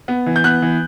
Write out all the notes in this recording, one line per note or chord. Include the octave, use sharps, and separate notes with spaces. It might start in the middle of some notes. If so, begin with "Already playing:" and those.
B3
E3
G6
B3 F#6
E3